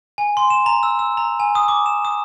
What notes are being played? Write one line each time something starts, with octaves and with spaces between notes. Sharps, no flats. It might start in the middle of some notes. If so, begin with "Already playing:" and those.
G#5
C6
E7
A#5
E6
E6
A#5
G#5
D#6
D6
E7
D#6